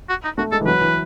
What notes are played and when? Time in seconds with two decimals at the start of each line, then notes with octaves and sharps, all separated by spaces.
0.09 F#4
0.24 D#4
0.38 A3 F#4
0.52 G#3 A4
0.61 E3
0.66 F#3 B4
0.81 E3